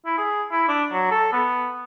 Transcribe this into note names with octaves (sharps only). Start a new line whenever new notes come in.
E4
G#4
E4
D4
F#3
A4
B3